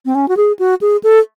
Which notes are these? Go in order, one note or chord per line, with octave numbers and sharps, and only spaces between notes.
C4
C#4
F#4
G#4
F#4
G#4
A4